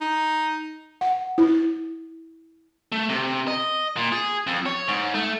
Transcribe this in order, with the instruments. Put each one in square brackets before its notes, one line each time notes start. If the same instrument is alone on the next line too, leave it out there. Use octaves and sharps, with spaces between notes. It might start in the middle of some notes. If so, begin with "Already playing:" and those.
[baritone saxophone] D#4
[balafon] F#5
E4
[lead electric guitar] A3
C3
D#5
A#2
G#4
F2
C#5
G#2
A3